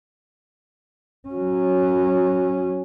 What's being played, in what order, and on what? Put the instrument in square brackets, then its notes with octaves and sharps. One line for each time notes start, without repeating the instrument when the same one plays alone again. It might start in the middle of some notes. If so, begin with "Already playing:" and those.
[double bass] F#3 C#4